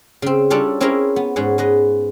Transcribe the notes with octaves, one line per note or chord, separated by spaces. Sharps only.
C#3 C4
G3 C#4 D4 F4 A4 D5
C4 C#4 E4 F4 G#4 A#4
B3
G#2 C#4 G#4 F#5
G#3 B4 D#5